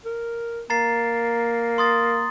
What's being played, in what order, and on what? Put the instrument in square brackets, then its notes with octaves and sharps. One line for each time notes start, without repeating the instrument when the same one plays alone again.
[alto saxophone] A#4
[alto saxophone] A#3 [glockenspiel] A#5 A6 C7
[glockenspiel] C6 D#6 A6